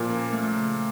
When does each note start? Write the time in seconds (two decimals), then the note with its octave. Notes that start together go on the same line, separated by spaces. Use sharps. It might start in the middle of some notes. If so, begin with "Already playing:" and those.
Already playing: A#2 F3 A#3
0.10 C#4
0.32 A3
0.56 C#3